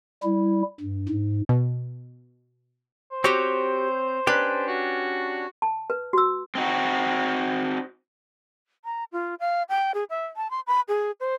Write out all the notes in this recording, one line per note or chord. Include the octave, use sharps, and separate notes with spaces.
G3 E4
G2
G#2
B2
C5
C4 F#4 G4 C#5
C#4 D4 G4 B4
F#4
A5
B4
F#4 E6
C4 D#4 F#4
A#5
F4
F5
G5
G#4
E5
A5
C6
B5
G#4
C5